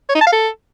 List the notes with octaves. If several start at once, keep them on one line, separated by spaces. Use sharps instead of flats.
C#5
D#4
A5
F5
A4